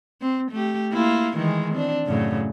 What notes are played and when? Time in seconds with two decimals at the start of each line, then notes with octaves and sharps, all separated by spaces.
0.21 C4
0.52 A3 G4
0.92 A#3 E4 F4
1.37 D#3 E3 G#3
1.74 C4 D4
2.06 F#2 A2 C#3